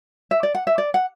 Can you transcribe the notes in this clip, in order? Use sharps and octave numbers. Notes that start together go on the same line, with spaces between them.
E5
D5
F#5
E5
D5
F#5